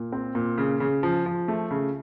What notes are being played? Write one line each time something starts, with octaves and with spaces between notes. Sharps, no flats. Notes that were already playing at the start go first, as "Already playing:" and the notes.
Already playing: A#2
C4
A#2
C#3
C#3
F3
F3
A3
C#3